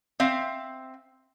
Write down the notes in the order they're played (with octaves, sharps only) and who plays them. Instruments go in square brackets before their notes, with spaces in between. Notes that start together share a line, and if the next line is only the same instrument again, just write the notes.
[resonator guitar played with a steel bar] C4 E5 F5